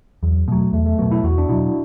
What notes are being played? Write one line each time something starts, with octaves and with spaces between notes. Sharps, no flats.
E2 F#3
B2 F#3 A3
E2 A3
A3
B2 F#3 B3
E4
E2 F#4
D4
B2 F#3 E4